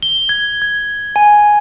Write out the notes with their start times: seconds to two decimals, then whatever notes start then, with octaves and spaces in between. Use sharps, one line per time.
0.03 G7
0.29 G#6
0.62 G#6
1.16 G#5